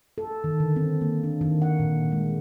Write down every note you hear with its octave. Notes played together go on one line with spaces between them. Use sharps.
A4
D#3
D3
C4
A#3
D4
D#3
F#5
A#2
G#3